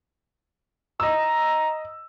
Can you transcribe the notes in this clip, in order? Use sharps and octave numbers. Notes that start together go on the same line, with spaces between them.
D#5 A#5 E6